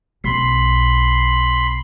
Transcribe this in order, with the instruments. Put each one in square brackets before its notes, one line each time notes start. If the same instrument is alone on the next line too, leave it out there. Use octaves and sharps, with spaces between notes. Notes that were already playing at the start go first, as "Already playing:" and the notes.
[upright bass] B1 [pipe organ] B5 C6